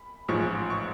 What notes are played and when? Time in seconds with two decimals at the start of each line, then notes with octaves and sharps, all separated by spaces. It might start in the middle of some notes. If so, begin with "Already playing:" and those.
Already playing: B5
0.29 A1 G#2 F3 G#3 C#6
0.70 C#6